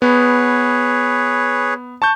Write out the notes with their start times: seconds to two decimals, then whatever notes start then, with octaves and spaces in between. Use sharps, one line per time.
0.02 B3 G#4 B4 C#5
2.02 A5 C#6 G6